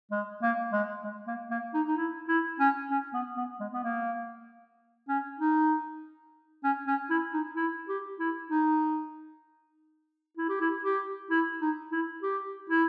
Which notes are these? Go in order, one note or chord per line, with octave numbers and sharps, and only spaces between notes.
G#3
A#3
G#3
G#3
A#3
A#3
D#4
D#4
E4
E4
C#4
C#4
B3
B3
G#3
B3
A#3
C#4
D#4
C#4
C#4
E4
D#4
E4
G4
E4
D#4
E4
G4
E4
G4
E4
D#4
E4
G4
E4